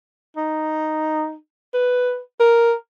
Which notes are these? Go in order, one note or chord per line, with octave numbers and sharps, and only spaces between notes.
D#4
B4
A#4